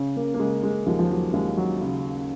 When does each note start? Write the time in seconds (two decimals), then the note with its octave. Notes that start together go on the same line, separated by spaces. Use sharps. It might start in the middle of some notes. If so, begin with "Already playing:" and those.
Already playing: C#3 C#4
0.17 A#3
0.34 A#3
0.40 C#3 G#3
0.63 G#3
0.86 D#2 F3
0.99 F3
1.10 F#3
1.33 D#2 G#3
1.57 F#3
1.81 C#3